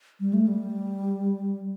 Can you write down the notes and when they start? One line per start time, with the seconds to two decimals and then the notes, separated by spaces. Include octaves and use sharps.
0.20 G3
0.33 A3
0.47 G3